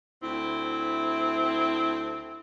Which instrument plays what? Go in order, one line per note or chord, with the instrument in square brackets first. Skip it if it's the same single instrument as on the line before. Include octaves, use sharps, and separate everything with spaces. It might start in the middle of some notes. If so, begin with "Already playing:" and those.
[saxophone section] D2 C4 E4